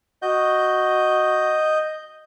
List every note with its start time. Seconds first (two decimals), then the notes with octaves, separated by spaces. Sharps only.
0.22 F#4 D#5 G6